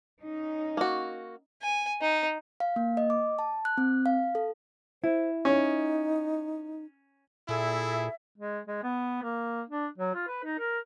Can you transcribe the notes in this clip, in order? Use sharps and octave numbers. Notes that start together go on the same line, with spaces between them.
C#4 D#4
A#3 F#4
G#5
D#4
F5
A#3
D#5
D6
A5
F#6
C4
F5
A4
E4 C5
C#4 D#4
A#2 E4 G#4 A4 E5
G#3
G#3
B3
A#3
D4
F#3
F4
B4
D#4
A#4